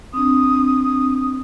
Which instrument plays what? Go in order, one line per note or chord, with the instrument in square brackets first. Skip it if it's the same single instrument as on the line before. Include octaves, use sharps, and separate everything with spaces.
[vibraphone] C4 D4 [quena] D#6